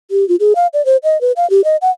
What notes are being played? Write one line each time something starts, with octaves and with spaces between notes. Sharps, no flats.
G4
F4
G#4
F5
D5
C5
D#5
B4
F5
G4
D#5
F#5